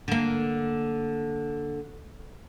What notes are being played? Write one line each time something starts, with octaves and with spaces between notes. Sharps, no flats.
D3 A#3